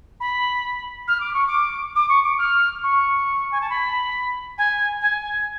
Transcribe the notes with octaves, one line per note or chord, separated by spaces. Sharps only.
B5
F6
D6
C#6
D6
D6
C#6
D6
F6
C#6
G#5
A5
B5
G#5
G#5